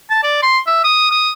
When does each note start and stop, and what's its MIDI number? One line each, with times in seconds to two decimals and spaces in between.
0.10 0.22 81
0.23 0.41 74
0.42 0.59 84
0.67 0.81 76
0.84 1.08 87
1.11 1.32 87